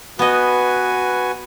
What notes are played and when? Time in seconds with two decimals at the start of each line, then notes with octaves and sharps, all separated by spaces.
0.19 B3 F#4 B4 D#5 G#5